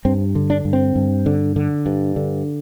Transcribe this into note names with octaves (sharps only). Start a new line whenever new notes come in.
G2 C4
D3
D4
G2
C4
G2
D3
D3
G2
D3